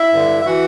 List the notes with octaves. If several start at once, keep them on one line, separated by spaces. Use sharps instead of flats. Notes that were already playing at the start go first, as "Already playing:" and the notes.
Already playing: E4 E5
G2 D3
E5
E3 F#4 F#5